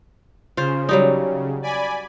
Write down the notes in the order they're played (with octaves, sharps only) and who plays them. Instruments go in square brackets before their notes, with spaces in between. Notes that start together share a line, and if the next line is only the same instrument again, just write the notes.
[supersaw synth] C#3 [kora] F4 C5
[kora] F#3 G3 D#4
[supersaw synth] D5 G#5 B5